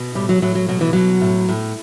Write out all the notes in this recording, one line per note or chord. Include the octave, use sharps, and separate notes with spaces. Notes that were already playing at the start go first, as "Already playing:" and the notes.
Already playing: B2
A2 G3
F#3
A2 F#3
F#3
B2 F#3
E3
B2 F#3
A2
A2